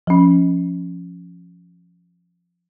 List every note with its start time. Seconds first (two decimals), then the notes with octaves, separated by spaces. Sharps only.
0.07 F3 C#4